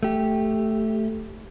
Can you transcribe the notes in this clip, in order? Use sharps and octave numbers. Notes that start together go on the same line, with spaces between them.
A3 G4